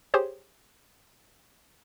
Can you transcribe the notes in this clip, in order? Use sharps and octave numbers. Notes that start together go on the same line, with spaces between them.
G4 G#4 C5 C#5